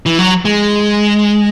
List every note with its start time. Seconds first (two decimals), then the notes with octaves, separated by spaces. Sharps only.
0.06 E3
0.19 F#3
0.45 G#3